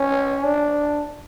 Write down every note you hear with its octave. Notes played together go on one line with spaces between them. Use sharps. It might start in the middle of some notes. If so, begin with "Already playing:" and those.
Already playing: C#4
D4